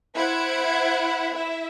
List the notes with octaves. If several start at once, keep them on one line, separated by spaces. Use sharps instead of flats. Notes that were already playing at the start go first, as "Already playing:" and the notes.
E4 C5 F#5 F#6 G#6 D7
E4 E5